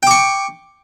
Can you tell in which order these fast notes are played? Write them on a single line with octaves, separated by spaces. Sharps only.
G5 D6 C#6